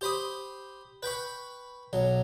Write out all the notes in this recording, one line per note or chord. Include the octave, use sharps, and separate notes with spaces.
G4 C5 B5 D#6
B4 G5 B5 C#6
B1 F#3